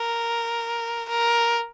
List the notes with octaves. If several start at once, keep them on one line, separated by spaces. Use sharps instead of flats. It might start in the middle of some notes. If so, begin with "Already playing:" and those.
Already playing: A#4
A#4